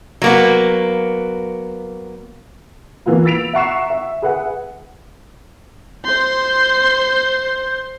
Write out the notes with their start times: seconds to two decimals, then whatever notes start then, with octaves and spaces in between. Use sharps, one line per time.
0.22 F#3 A#3 B3
3.06 E3 A#3 B3 F4 B4
3.25 E6 A6 B6 D7 F7
3.53 E5 F#5 A#5 C#6 C7 E7
3.90 E5
4.22 G#4 B4 E5 F#5
6.04 C5 C6 G6